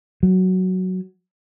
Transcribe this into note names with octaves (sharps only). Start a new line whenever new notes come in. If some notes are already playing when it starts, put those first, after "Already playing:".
F#3